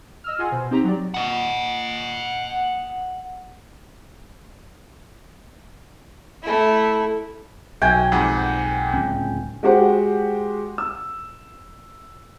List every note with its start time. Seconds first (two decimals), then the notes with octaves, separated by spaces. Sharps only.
0.24 D#5 E6 F6
0.38 F4 G#4 D#5 F#5 G#5 C6
0.52 B2 C5
0.71 C4 D#4 G4 A#5
0.84 F#3 D5
1.14 D#5 F#5
6.42 A3 E4
7.82 B1 F#3 G5 G#5
8.12 F2 G#2 F#5
8.93 D1 C#2 C#4
9.63 G#3 F#4 G4 C5 F#5
10.78 E6